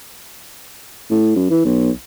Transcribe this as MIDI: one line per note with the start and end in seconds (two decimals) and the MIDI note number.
1.10 1.35 45
1.36 1.47 42
1.50 1.62 52
1.65 1.90 35